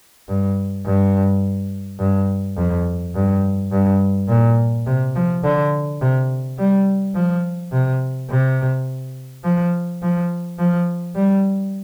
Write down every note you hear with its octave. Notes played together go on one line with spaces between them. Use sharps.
G2
G2
G2
F2
G2
G2
A#2
C3
F3
D3
C3
G3
F3
C3
C3
F3
F3
F3
G3